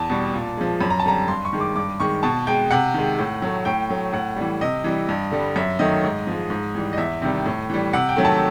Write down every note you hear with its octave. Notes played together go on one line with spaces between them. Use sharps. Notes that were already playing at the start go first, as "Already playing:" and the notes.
Already playing: E2 A5
B2 G3
A#2
F3 G#3
F#2 B5
A#5
A5
D3 G3 A#5
G2 C6
C#6
D#3 G#3
D6
G2 D6
D#3 G#3 C#6
B2 A5
G#3 G5
C3 F#5
D#3 G#3
A2
F#3 A3
A2 G5
F#3 A3
A2 F#5
E3 G3
C3 D#5
E3 G3
G2
D3 G3
F#2 E5
D#3 F#3 A3 D#5
G#2
F3 G#3
G#2
E3 G3
D#5
E2 E5
C3 D#3 G3
A2
E3 G3
C3 F#5
G5
D#3 F#3 A3
A5